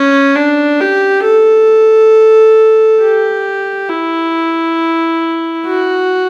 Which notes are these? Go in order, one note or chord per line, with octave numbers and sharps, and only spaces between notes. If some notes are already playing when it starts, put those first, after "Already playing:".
Already playing: C#4
D4
G4
A4
G4
E4
F#4